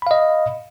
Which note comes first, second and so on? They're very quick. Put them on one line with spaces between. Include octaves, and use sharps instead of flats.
B5 F5 D#5